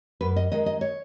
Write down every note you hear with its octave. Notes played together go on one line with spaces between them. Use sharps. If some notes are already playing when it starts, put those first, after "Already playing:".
F#2 B4
D#5
D#3 G#3 D#5
D#5
C#5